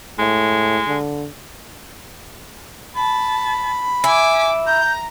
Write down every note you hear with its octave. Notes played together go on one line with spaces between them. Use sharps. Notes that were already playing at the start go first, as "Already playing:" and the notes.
A2 G#3
D3
A5 B5
E4 G#5 D6 B6
A#5 G6